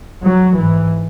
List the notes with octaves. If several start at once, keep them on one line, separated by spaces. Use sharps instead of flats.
F#3
G#2 E3